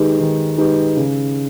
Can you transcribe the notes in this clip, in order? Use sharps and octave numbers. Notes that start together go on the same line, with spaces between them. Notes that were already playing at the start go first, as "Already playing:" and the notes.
Already playing: D#3 G#3 D#4 G4 B4
D#3
G#3 D#4 G4 B4
C#3